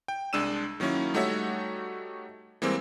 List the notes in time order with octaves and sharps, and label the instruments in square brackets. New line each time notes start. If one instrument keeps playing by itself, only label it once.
[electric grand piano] G5
C2 G#3 D4 E6 D#7 E7
D#3 F#3 A#3 C#4 E4
G3 A3 D#4 F#4 C#5 E5
E3 G3 G#3 A#3 C4